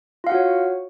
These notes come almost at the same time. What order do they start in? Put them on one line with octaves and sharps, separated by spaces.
F4 F5 F#5 F#4 C#5